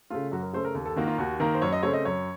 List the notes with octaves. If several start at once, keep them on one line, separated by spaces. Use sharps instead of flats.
C#3 A3 F4
F#2 F#4
A#4
C#3 A3 C5
A#4
D#2
A4
D#3 A#3 F#4
F4
D#2 F#4
D#3 A#3 A#4
C5
F#2 C#5
D#5
C#3 A3 C4 C#5
D#5
F#2 C#5